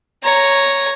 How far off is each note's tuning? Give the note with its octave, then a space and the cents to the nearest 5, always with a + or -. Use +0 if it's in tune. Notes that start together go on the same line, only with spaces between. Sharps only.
C#5 +0 A#5 +0